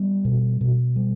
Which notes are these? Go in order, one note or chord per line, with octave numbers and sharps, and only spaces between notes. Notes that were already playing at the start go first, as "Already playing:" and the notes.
Already playing: G3 B3
B2
B2
G3